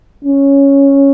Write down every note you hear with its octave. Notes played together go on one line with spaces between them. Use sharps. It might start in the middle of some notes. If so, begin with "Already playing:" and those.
C#4